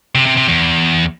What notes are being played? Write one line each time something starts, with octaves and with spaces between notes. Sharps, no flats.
C3
C3
C3
E2